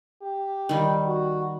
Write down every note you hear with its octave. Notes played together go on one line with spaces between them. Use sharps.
G4
D#3 G3
F#4